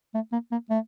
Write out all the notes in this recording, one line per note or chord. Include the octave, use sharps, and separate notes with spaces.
A3
A#3
A#3
A3